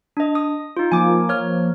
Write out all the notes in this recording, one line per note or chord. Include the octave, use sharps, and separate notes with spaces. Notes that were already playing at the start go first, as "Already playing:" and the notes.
D4 D#5
D#6
D#4 F4
F3 A#3 G#5 D6
C#5 F6